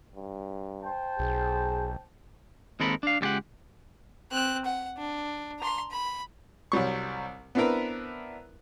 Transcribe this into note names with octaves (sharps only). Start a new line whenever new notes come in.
G2
C5 G5 A5
B1 G#4
D#2 G#3 C4 A4 A#4 B5
D4 F5
C#2 G3 G#3 G4 F#5
C4 F#6
F#5
D4
A#5 C6
B5
C2 F#3 G3 C#6
B3 C4 D4 E4 A#4 B4